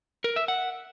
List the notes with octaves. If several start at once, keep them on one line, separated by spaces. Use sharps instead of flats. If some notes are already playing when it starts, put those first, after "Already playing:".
A#4
E5
F#5